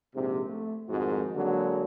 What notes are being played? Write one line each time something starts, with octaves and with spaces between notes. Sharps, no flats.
A#1 G#2 C3
A3
F2 G#2 D#3 F#4
D3 F#3 G#3 A#3